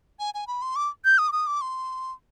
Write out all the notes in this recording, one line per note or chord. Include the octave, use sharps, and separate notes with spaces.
G#5
G#5
B5
C6
D6
G6
D#6
D6
D#6
D6
C6